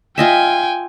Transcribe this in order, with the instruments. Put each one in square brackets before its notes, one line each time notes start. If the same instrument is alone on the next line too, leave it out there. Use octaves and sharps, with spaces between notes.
[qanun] F4 D#5 E5 [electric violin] G5 G#5